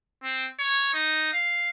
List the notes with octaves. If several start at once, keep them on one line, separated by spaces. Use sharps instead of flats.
C4
C#5
D#4
F5